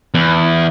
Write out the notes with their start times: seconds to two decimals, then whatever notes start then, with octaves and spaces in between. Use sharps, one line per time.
0.14 E2